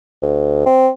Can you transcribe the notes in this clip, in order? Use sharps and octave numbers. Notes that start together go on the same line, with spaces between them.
D2
C4